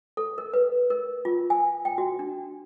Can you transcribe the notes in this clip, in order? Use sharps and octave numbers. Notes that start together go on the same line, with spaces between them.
A4
A#4
B4
A#4
F4
G#5
G5
F#4
D4